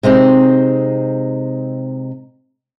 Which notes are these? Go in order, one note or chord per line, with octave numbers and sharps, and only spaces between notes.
C3 G#3 C4 D#4